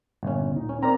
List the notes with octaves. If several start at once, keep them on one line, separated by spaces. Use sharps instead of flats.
G1 A#2 C#4
D2 A#2 D#4
C#4
C4 A#4 D5 A#5